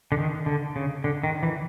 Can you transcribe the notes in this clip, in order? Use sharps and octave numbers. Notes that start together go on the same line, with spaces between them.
D3
D#3
D3
C#3
D3
D#3
E3